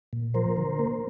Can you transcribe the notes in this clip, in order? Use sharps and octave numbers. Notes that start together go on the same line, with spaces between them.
A#2
F3 A#4 C5
D3
A#3